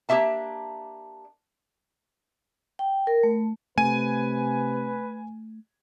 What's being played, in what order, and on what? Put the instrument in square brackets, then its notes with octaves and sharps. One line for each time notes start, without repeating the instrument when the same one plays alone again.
[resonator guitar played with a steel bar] A#3 D4 G4 E5 A5
[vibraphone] G5
A#4
A3
[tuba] C3 [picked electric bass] A3 [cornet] B4 [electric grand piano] G#5 D#7